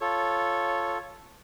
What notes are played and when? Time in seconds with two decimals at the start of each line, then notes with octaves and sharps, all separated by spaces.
0.01 F4 A4 C#5